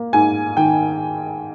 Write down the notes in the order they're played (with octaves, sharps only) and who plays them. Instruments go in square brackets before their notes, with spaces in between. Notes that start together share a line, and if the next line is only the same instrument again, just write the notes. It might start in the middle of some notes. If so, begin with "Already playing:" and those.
Already playing: [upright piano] A#3
G#2 G#5
D#3 G5